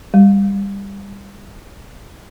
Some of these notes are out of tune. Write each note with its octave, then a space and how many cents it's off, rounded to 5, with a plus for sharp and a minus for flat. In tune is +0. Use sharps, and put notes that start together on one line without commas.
G3 +25